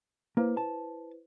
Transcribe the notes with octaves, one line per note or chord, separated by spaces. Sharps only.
A#3 E4 B4 C5
A5